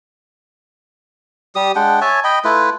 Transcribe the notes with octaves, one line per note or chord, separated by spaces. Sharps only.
G3 G4 D#6
G#3 D4 F#5 G5
C#5 E5 G#5 A5
D#5 G5 B5
A3 E4 F4 B4